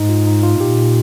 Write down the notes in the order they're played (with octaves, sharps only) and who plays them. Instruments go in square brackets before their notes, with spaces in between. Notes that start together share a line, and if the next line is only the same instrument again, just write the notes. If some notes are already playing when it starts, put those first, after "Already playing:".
Already playing: [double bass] G#2 [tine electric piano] D#4
[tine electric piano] F4
D#4
F4
[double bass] A#2 [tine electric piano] G4